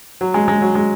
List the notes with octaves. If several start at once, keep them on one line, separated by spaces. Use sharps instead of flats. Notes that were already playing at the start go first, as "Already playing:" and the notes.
F#3
G#3
G#3
F#3
G#3